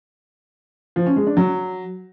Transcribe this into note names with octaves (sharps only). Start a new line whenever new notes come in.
F3
C#4
G#3
D4
F#3